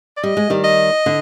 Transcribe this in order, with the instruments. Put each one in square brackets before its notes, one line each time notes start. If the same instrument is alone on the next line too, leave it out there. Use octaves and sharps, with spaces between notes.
[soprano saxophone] D5
[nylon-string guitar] G3 [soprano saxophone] D#5
[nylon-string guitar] G#3
D#3 G3
[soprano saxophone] D#5
[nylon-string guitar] D3